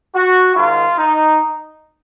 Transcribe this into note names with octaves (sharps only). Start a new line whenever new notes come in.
F#4
G#2 D#3 F4
D#4